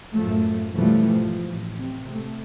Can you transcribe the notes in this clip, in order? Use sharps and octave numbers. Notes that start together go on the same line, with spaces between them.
F#2 A2 F3 A3
F#2 B2 E3 F3 G3 A3
G#2 F3
A1
C3
A3